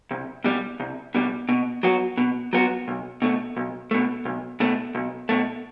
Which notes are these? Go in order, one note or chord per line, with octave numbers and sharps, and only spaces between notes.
C2
B2 G3
C2
B2 G3
B2
F#3 B3 F#4
B2
F#3 B3 F#4
B1
B2 A3
B1
B2 A3
B1
B2 A3
B1
B2 A3